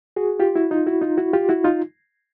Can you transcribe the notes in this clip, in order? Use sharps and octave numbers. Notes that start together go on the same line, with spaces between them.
F#4 G#4
F4 G4
E4 F#4
D#4 F4
E4 F#4
D#4 F4
E4 F#4
F4 G4
E4 F#4
D#4 F4